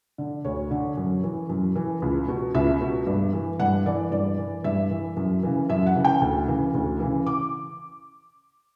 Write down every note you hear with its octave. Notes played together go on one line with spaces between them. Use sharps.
D3
D2 C#5
D3
F#2
E3
F#2
E3
C#2
B2
C#2 E5
B2
G2
E3
G2 F#5
E3 D5
G2 D5
E3
G2 E5
E3
F#2
C#3 E3
F#2 E5
F#5
C#3 E3
G5
D2
C#3 E3
D2
C#3 E3
D6